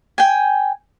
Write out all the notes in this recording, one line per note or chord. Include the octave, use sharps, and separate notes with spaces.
G5 G#5